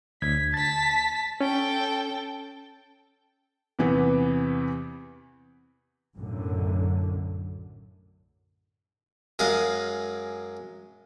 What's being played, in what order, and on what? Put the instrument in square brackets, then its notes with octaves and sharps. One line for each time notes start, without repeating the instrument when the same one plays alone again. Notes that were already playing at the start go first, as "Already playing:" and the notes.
[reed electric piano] D2 G#6 [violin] B6
[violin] A5 B6 [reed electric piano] A6
[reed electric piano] C#4 [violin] A4 G5
[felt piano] E2 C3 E3 B3
[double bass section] B1 F#2 A2 D3
[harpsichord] F#2 G#3 D#5 F5